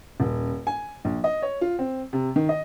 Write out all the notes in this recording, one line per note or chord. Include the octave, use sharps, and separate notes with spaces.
D#1
G#5
A#1
D#5
C#5
F4
C4
C3
D#3
D#5